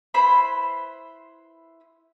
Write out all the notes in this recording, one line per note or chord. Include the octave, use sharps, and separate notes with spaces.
E4 B4 C5 B5